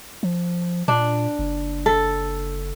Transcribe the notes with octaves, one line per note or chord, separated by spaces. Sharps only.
F3
A#2 D4
F#1
A4